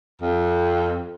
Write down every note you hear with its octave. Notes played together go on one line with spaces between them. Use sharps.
F2